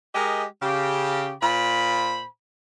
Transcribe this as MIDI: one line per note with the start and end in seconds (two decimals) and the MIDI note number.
0.14 0.44 56
0.14 0.44 67
0.14 0.44 70
0.14 0.44 75
0.62 1.32 49
0.62 1.32 67
1.41 2.25 46
1.41 2.25 72
1.41 2.25 83